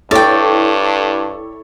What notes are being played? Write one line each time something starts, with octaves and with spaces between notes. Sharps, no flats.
G2 E4 A4 C#5 D5 G5